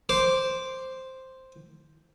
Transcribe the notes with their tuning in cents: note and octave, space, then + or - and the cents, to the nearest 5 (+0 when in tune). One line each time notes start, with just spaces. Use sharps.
C5 +0 D6 -10